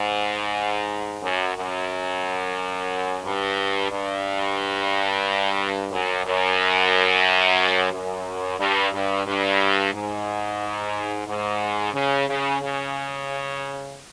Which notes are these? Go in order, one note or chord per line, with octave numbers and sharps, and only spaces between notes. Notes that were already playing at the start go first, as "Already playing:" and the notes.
Already playing: G#2
F#2
F#2
G2
G2
F#2
F#2
F#2
G2
G2
G2
G#2
G#2
C#3
C#3
C#3